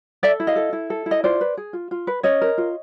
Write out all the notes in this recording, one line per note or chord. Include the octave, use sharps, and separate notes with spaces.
A4 D5 E5
E4
D#5 F5
A4
E4
A4
E4
D#5
F4 C5 D5
B4
G#4
F4
F4
B4
C#4 C#5 D#5
A#4
F4